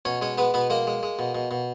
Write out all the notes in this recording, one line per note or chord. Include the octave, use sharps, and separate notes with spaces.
B2 C#4 C#5
G#3 C#4 C#5
G#3 B3 B4
B2 B3 B4
G#3 A#3 A#4
G#3
G#3
B2
B2
B2